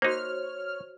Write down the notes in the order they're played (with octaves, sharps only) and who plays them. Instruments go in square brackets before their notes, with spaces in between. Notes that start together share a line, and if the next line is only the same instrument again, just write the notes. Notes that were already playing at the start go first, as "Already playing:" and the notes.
[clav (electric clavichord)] A#3 D#4 [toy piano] F#4 C5 [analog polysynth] C#5 F6